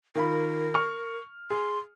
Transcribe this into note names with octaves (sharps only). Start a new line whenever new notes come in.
D#3 F4 A#4 B5
C#6 F6
G#4 C6